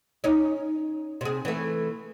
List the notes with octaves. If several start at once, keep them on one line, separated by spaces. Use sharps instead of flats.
C#4 D#4
C3 G#4
E3 A3